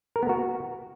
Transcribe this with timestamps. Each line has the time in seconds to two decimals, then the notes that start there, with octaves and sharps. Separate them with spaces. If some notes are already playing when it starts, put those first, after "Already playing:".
0.16 A#4
0.22 B3
0.29 F#4